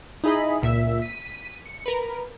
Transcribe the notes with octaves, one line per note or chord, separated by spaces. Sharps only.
D#4 E4 G#4 D#5 B5
C#2 A#2 E5
B6 D#7
C#7
A#4 B4